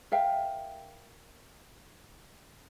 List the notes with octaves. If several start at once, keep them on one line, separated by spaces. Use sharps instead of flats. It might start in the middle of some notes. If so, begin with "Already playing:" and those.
A#4 E5 F5 G5